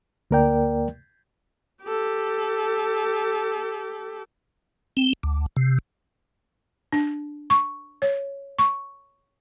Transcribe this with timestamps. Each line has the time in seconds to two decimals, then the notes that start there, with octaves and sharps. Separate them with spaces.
0.31 D2 A#3 A#4 D5 G5
1.84 G4 A4
4.97 C4
5.23 D2
5.56 C3
6.92 D4
7.50 C#6
8.02 C#5
8.59 C#6